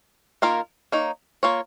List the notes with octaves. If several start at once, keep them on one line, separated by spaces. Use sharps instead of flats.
D#3 A#3 F4 A#4
A#3 D#4 C#5
A#3 F4 C#5